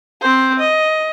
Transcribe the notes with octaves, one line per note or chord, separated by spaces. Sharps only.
C4 C5
D#5